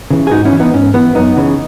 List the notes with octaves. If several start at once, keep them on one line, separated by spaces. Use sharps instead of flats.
C#3 E3
G#4
G#2 D#4 F#4
C#4 E4
E3
B3 D#4
G#2 C#4
E3 B3
F#2 B3 D#4
C#3 E3